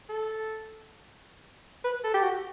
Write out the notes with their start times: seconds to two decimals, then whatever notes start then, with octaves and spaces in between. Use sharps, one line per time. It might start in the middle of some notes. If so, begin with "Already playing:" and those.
0.09 A4
1.84 B4
2.04 A4
2.14 G4
2.24 F#4